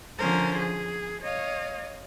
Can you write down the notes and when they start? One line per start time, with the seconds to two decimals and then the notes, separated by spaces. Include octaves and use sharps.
0.18 D3 F3 C#4 A#4 C5
0.59 G#4
1.22 C#5 D#5 F5